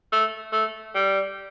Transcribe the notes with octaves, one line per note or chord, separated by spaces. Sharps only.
A3
A3
G3